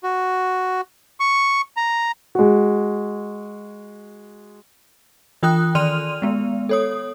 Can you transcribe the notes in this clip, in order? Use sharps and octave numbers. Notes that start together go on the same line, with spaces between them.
F#4
C#6
A#5
G#3 F#4
E3 F4 G5 D#6 F#6
D#3 D5 C6 F6 D#7 F7
G#3 B3
A4 C#5 D#6